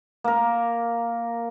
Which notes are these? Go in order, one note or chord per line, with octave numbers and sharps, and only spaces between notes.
A#3 A#4